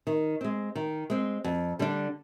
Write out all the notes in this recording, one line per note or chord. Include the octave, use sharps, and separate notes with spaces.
D#3
G#3 C4
D#3
G#3 C4
F2
D3 G3 D4